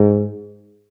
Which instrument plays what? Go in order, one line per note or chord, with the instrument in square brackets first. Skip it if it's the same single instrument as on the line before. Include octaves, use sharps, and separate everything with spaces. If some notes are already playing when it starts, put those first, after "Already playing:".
Already playing: [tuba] G#2